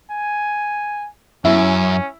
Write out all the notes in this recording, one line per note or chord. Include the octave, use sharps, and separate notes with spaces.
G#5
F#2 C#4 E4